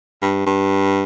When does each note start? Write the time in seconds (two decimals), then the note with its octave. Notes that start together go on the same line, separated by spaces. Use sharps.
0.22 G2
0.46 G2